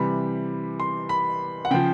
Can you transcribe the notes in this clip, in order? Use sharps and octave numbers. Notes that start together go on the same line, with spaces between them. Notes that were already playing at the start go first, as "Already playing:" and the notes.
Already playing: C3 E3 G3 B5
C6
B5
F#5
C#3 F3 G5